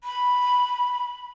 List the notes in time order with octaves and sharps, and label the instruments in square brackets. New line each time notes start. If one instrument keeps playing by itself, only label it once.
[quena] B5